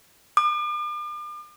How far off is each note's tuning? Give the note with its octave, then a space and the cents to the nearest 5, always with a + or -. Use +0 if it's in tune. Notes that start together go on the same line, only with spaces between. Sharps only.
D6 +40